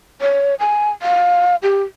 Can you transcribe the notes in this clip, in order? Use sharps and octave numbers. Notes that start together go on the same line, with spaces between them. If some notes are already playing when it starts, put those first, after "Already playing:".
C#5
G#5
F5
G4